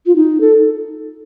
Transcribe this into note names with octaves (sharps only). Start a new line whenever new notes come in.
F4
D#4
A4